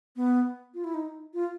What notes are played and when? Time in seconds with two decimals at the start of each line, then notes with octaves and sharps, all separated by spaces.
0.16 B3
0.74 F4
0.84 E4
0.94 D#4
1.34 F4